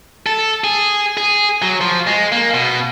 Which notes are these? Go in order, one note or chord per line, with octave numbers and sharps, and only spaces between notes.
A4
G#4
G#4
F#3
F3
G#3
A#3
B2